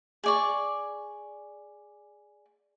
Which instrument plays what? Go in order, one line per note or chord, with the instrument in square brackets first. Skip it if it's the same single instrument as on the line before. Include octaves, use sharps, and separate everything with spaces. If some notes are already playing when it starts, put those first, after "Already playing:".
[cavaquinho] G#4 D5 C#6